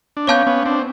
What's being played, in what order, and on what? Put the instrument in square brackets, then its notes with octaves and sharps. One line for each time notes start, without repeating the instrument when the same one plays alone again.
[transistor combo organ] D4
[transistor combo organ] B3 C#4 [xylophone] C#5 F5 A5 D6 G6
[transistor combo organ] B3 C#4
C4 D4